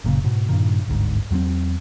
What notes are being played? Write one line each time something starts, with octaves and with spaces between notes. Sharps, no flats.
F#1 A#2 C#3
G#2 B2
G2 A#2 D#3
G1 D2 G#2
E2 F#3 G3 C4